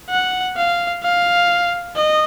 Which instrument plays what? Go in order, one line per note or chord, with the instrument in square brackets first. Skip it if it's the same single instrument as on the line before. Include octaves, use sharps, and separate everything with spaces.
[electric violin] F#5
F5
F5
D#5